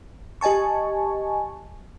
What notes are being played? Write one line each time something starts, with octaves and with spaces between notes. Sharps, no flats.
G4 D#5 G#5 A5 C#6